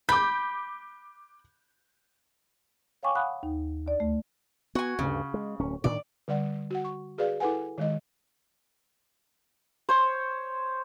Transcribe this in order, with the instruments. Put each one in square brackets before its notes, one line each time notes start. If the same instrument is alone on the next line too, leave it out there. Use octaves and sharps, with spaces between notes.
[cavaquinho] B5 [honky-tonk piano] D6 G6
[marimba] C#5 F5 G5 G#5 C#6 D6
F5 F#5 G#5 B5 D#6 F#6
D#2 D#4
D2 D5
A3
[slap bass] B3 [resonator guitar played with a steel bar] F#4 G#5
[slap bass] D2 G2 [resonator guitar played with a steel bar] C#3
[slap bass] G#3
D1 C#4
[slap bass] A2 D#3 D4 [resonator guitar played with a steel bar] D5
[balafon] D3 G3 D5 F#5
F#4 F#5
C#6
F#4 G#4 B4 D5 F5
E4 A4 B4 F#5 G#5
D#3 G#3 D#5
[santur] C5 C#5